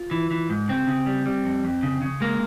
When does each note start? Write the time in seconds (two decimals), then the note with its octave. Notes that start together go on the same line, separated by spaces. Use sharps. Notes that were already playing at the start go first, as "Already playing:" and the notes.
Already playing: F4
0.11 E3
0.31 E3
0.50 G#2
0.68 C#3 C4
0.87 C#3
1.06 G3
1.26 G3
1.45 F2
1.65 F2
1.83 C#3
2.02 C#3
2.21 G#3 A#3